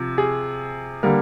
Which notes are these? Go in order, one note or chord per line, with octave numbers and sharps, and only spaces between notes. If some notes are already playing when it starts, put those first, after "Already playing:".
Already playing: C3 F3
G#4
D3 G3 A#3 A#4